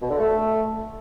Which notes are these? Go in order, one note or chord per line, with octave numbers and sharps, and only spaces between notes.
B2
D3
A3